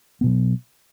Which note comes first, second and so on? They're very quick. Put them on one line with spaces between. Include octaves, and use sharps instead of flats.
B3 B2 F#3